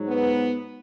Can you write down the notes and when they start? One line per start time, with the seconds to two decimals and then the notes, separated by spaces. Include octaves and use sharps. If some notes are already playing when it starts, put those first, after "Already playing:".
Already playing: G#2 F#3
0.09 B3